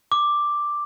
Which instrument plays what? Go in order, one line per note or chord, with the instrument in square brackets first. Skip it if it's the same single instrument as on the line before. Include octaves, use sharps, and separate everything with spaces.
[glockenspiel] D6